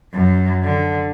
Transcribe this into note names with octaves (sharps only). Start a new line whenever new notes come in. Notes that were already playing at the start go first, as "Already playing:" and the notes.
F#2
D3